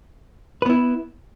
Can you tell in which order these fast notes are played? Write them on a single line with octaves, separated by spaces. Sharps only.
B4 B3 E4